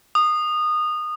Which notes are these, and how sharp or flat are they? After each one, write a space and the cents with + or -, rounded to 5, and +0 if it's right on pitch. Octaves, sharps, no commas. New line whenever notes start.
D#6 -20